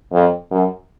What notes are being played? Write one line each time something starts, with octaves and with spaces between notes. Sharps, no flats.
F2
F#2